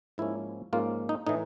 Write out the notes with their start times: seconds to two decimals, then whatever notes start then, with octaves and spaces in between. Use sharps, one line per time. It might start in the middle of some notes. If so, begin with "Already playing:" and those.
0.18 G#2 F3 A#3 C#4 E4
0.73 G#2 F3 A#3 C#4 F4
1.09 D#4
1.27 A2 E3 D#4